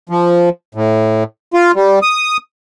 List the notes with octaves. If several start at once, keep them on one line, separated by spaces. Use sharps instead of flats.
F3
A2
F4
G3
D#6